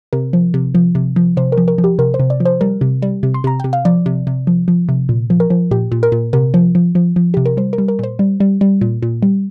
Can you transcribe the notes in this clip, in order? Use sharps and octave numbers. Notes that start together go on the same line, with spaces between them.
C3 A#4
F3
C3
F3
C3
F3
C3 C5
A#4
F3
A#4
F3
G4
C3 A#4
C5
C3
D5
F3
C5
G3 A#4
C3
G3
C3
C6
C3 A#5
C3 G5
F5
F3 D5
C3
C3
F3
F3
C3
A#2
F3
A#4
F3
A#2 G4
A#2
A#4
A#2
C3 A#4
F3
F3
F3
F3
C3 G4
A#4
G3 C5
A#4
G3
A#4
A#2 C5
G3
G3
G3
A#2
A#2
G3